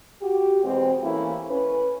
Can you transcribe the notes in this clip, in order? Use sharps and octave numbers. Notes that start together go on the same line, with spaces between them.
F#4 G4
E2 B2 G#3 C4
E3 A3 A#3 C#4 E4
C#4 B4